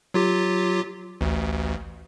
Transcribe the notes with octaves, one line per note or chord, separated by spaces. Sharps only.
F#3 F4 G4
A1 D2